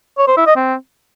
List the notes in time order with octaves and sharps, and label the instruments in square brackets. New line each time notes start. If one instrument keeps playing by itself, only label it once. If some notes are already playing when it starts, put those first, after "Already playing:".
[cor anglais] C#5
C5
E4
D#5
C4